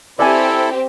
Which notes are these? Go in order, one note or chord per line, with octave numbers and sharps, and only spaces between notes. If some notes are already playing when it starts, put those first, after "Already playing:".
C4 E4 G4 A4 D5 E5 G#5